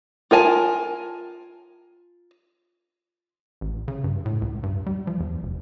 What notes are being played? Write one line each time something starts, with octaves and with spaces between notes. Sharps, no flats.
F4 A#4 G#5 A5
A1
C#3
G2
A2
C#2
G2
G3
F3
E2
F1